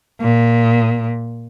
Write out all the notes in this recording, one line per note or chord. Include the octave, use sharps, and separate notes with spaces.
A#2